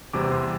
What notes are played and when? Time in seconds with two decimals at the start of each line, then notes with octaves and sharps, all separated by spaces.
0.13 E2 C3 G3 C4 D6
0.32 C6